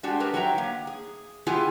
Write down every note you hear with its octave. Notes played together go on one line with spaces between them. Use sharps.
G#3 D4 F#4 G4
A3 G4 G#4 A#4 B4
F#3 E5 G5 A#5
A#3
G#4
B3 E4 F4 G4 G#4 G#5